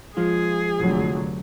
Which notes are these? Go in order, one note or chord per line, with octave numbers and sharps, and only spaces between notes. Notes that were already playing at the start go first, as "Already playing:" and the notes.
F3 G#3 F4 G#4
F1 D3 F#3